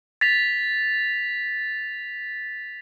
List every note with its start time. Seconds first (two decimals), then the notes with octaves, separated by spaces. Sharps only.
0.21 A6 B6 F7